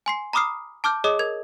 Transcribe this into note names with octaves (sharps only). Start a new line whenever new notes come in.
G#5 C6 C7
A#5 B5 D6 D#6 F6 C7
A5 D6 F6 G6
G#4 C#5 D#5 D6 D#6
A#4 G#6